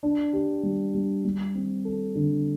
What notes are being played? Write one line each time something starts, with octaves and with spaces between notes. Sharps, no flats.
D4
G4
G3
G3
G3
C4
A4
D3